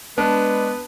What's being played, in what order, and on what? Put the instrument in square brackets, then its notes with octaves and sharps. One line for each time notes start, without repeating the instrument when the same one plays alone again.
[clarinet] G#3 [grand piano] B3 [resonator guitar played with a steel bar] D4 [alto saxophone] B4